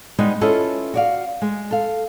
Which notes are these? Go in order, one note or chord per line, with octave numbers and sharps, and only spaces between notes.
G3 G#3 B3 D#4
C#4 E4 F4 A4 B4 D#5
F#4 D5 F5
G#3
A4 F5